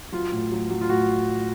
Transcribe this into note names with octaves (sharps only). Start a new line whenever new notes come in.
F#3 F4
A2
F#3
F#3
F4
A2 F#4